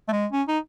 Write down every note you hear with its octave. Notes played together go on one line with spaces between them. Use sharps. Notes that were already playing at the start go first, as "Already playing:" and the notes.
A3
G#3
C#4
D#4